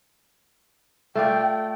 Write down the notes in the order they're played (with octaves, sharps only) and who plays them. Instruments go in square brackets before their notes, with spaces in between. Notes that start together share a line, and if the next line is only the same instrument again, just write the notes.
[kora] A3 F4 D5 [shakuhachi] G5